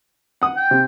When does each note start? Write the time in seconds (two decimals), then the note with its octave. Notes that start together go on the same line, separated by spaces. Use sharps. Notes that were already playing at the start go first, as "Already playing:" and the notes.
0.42 F#5 D#6
0.57 G5
0.71 C3